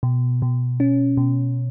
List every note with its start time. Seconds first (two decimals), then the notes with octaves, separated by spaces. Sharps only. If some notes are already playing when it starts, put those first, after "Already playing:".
0.03 B2
0.42 B2
0.80 C#4
1.17 B2